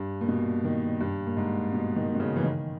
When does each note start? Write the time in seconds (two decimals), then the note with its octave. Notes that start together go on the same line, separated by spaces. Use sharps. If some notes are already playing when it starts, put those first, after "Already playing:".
Already playing: G2
0.21 A#2
0.28 B2
0.64 D#3
1.01 G2
1.27 A#2
1.37 G#2
1.72 B2
1.96 D#3
2.15 B2
2.20 C#3
2.36 E3
2.44 D#3